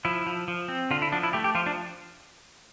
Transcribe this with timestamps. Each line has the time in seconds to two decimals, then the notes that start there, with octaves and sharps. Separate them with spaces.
0.05 F3 E4
0.27 F3
0.48 F3
0.68 C4
0.91 D3 F4
1.02 E4
1.12 F3 D4
1.23 E4
1.33 A3 G4
1.44 G4
1.55 F3 F4
1.66 D4